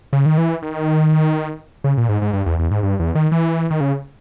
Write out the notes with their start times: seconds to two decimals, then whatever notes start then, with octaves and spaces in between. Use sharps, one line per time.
0.13 C#3
0.26 D#3
0.38 E3
0.62 D#3
1.84 C#3
1.98 A#2
2.09 G#2
2.22 G#2
2.33 G2
2.46 E2
2.59 E2
2.71 G#2
2.83 G2
3.00 E2
3.15 D#3
3.32 E3
3.70 D#3
3.81 C#3